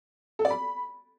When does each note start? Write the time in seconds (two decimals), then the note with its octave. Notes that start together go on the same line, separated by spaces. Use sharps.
0.39 A4
0.45 D5
0.50 B5